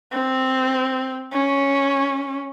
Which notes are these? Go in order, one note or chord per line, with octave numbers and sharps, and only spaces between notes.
C4
C#4